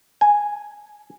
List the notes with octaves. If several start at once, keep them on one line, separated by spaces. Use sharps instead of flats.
G#5